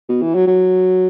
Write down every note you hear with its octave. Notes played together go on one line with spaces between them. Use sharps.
B2
E3
F#3
F#3